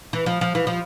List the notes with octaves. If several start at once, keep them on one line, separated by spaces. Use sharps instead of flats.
E3
F3
F3
E3
F3